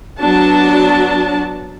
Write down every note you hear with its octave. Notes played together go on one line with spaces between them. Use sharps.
F#3 B3 D4 F#4 A5